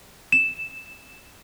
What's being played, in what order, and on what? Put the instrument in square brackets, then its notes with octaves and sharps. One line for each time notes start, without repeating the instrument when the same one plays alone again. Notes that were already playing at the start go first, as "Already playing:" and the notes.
[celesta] E7